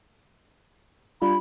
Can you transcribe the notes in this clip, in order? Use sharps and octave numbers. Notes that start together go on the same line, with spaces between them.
G3 D4 F4 B5